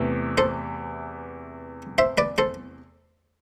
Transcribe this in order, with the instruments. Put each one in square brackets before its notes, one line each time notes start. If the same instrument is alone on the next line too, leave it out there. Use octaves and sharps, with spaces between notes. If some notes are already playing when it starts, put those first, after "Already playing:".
Already playing: [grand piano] E2 C3 E3 A3
[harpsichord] A4 C5
C5 E5
B4 D5
A4 C5